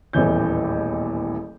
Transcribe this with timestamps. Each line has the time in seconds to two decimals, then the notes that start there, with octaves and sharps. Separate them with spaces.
0.13 D#1 A1 E2 E3 G6